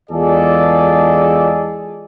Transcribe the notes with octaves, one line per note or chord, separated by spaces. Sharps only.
E2 G#3 F4 G#4 A4 D5